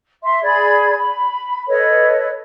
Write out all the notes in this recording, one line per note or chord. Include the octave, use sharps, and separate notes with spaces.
E5 C6
G#4 D5 B5 G#6
B5
A4 B4 C#5 D#5